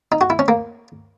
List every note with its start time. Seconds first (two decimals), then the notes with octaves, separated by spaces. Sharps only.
0.12 D#4
0.21 F#4
0.30 E4
0.39 C#4
0.48 A#3